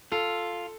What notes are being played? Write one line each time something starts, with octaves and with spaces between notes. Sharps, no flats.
F4 A4